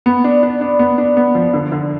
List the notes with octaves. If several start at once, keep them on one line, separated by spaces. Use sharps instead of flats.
B3
D4
D4
D4
B3
D4
B3
F3
D3
D3